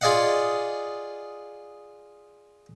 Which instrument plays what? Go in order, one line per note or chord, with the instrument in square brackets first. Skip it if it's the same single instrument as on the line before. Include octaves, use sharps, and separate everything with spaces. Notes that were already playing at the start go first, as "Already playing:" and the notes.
[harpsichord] F4 G#4 D5 D#5 F5 F#5